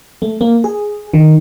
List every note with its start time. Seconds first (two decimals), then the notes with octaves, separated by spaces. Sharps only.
0.22 A3
0.41 A#3
0.64 G#4
1.14 D#3